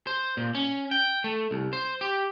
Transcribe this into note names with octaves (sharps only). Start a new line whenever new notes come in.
C5
A#2
C#4
G5
A3
C2
C5
G4